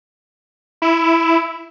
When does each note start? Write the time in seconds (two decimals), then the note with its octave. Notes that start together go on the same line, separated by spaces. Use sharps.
0.82 E4